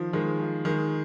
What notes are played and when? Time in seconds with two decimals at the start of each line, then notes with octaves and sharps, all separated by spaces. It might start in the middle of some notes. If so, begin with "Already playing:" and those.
Already playing: D#3 F3
0.13 D#3 G#3
0.39 F3
0.65 D#3 G#3